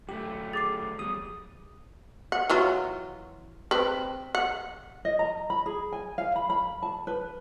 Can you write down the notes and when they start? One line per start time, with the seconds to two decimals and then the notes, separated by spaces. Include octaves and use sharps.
0.09 F#2 A3 G4
0.53 G#4 D6 A6 C7
0.99 E2 G3 D#6
2.32 F#5
2.50 E3 F#3 F4
3.71 C4 B4
4.35 F#5
5.05 D#5
5.19 A#5
5.50 B5
5.66 G#4
5.92 G#5
6.18 F5
6.36 B5
6.50 B5
6.83 A5
7.07 B4